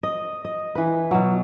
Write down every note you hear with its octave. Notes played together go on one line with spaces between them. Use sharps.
D#5
D#5
E3 B4
B2 F#3